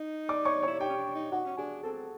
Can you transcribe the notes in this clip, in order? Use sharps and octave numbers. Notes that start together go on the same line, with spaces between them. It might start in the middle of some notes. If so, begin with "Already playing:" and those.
Already playing: D#4
D5 D6
C#5 C#6
E4 C#5 C#6
D#4 G4 G5
C#4
D4
D#4
D#4 F#4 F#5
C#4
D4 G#4 G#5
C4 A4 A5